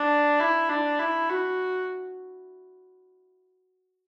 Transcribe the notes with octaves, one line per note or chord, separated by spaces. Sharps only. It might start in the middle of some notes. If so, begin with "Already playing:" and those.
Already playing: D4
E4
D4
E4
F#4